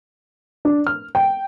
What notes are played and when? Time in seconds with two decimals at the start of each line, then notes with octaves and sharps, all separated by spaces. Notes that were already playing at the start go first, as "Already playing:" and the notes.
0.65 D4
0.87 F6
1.15 G5